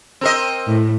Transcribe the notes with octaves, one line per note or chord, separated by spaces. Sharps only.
C4 A#4 D#5
A2